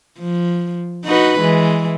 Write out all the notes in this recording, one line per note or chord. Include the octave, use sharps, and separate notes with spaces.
F3
D#4 F#4 B4
E3 G#3